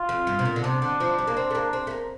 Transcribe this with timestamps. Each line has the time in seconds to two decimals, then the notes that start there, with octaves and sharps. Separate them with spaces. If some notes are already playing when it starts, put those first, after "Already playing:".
Already playing: F4
0.09 F2
0.27 G2
0.39 C3
0.45 A#2
0.56 D3
0.64 C3 D4
0.82 D3
1.00 F3
1.19 G3
1.27 A#3
1.37 C4
1.50 A3
1.55 A#3
1.73 C4
1.87 A3
1.91 A#3